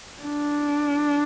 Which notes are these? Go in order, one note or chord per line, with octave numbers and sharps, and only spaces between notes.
D4